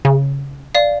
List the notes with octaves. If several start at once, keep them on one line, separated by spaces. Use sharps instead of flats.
C#3
D5 F5